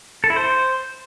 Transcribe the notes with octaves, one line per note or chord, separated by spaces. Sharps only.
A4
E4
C5